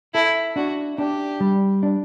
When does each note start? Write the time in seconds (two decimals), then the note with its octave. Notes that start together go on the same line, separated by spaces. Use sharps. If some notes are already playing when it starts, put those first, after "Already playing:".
0.14 E4 A4
0.56 D4 F#4
0.98 D4 G4
1.40 G3
1.83 D4